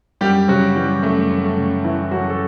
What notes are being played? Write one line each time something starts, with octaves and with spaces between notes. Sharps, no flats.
F#2 G3 G4
C#3 F#3 F#4
E3 G3
F#2 A3
F#2
A3
C#3
E3 E4
F#2 F#3 F#4
A4